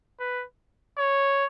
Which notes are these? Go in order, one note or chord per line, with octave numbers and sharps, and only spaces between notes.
B4
C#5